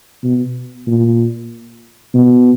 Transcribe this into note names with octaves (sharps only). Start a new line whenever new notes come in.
B2
A#2
B2